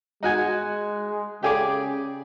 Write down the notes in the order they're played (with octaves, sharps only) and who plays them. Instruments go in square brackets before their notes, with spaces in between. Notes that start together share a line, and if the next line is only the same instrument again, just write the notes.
[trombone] G#3 [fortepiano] D#4 F#4 G#5
[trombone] C#3 [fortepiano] G4 G#4 D5